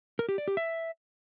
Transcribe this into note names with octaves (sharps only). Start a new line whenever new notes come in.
A#4
G4
D5
G4
E5